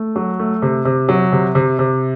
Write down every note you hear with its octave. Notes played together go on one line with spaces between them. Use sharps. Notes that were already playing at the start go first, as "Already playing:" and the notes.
Already playing: A3
F#3
A3
C3
C3
F#3
C3
C3
C3